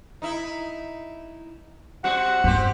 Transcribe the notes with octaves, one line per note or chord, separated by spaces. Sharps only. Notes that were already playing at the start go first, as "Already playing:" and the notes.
D#4 E4
G3 C4 F#4 F#5
E2 G2 C4 G4 C5